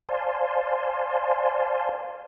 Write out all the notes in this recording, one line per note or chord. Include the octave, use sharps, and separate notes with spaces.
C5 D5 F5 G#5 A5 C6